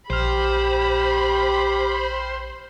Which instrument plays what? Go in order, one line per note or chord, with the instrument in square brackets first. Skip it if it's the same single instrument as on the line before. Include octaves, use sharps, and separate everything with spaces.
[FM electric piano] A#1 F6 [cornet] G4 [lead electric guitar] C5 [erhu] B5